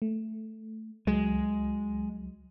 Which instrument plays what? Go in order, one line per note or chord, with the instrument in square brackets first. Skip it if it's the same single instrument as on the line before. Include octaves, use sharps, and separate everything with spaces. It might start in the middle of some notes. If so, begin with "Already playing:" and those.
[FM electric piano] A3
[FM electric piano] C#2 F#3 [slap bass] G#3